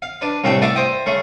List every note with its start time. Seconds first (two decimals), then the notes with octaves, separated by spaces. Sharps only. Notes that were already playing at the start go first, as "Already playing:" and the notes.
0.02 F5
0.21 D4 B4
0.44 C2 A2 A3 E4 G5
0.62 A3 B3 D5 E5 F5
0.75 C5 D#5 G5
1.06 C#3 A3